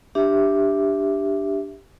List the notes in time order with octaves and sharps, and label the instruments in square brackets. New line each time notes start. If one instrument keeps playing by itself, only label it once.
[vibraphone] D4 G4 E5